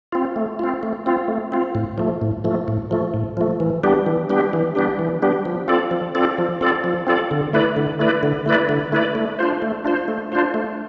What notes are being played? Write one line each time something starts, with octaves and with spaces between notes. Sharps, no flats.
C4 F4
A3
C4 F4
A3
C4 F4
A3
C4 F4
A2
F3 A3
A2
F3 A3
A2
F3 A3
A2
F3 A3
E3
G3 B3 D4 G4
E3
G3 B3 D4 G4
E3
G3 B3 D4 G4
E3
G3 B3 D4 G4
F3
C4 F4 A4 D5
F3
C4 F4 A4 D5
F3
C4 F4 A4 D5
F3
C4 F4 A4 D5
D3
A3 E4 B4 D5
D3
A3 E4 B4 D5
D3
A3 E4 B4 D5
D3
A3 E4 B4 D5
A3
D4 F4 C5
A3
D4 F4 C5
A3
D4 F4 C5
A3